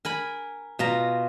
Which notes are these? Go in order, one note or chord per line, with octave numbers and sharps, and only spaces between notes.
A#4 G#5 B5
B2 F4 A#5